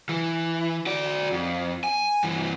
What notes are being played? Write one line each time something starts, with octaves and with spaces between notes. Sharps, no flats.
E3
F#4 D5
F2
G#5
G2 E3